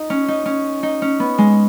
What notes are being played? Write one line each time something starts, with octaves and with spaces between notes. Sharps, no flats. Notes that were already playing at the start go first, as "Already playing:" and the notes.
Already playing: D#4
C#4
D#4
C#4
D#4
C#4
B3
G#3